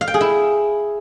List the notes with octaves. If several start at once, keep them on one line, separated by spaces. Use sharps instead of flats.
F5
G5
G#4
E4